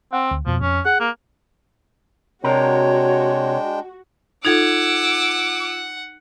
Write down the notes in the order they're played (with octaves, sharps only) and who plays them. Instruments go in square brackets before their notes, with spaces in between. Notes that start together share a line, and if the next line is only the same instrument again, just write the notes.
[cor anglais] C4 [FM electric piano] F#5
[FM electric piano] D2
[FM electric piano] F2 B2 [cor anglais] F3
[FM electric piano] F2 [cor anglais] C#4
[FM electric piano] G#4 [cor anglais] F#5
[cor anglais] A#3
[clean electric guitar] C3 A#4 [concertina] G#3 D4 G5 [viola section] F#4 [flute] C#5
[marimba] D#4 A4 [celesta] F4 G#6 F7 [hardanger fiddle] F#5 [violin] D6 E6